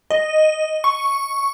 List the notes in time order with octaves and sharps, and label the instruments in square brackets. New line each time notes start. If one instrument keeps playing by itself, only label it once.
[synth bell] D#5
C#6